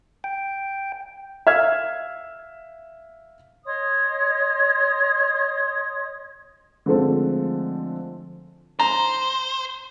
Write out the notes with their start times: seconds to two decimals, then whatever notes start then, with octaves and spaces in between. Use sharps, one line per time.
0.24 G5
1.47 E5 F5 F6 G#6
3.65 C#5 D#5 C6 D#6
6.86 D3 F3 G#3 A3 C4 A4
8.79 C5 A#5